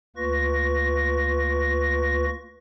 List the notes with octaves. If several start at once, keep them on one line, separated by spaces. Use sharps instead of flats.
D2 A#3 F4 B4 C#6 A#6